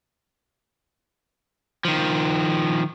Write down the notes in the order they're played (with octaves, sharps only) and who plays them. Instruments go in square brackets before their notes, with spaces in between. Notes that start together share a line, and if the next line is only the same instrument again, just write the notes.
[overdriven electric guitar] D#3 F3